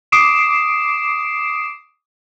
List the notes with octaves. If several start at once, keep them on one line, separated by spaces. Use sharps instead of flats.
D6 D#6 C7 D7 E7